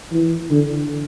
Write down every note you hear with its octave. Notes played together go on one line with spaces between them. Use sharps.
E3
D3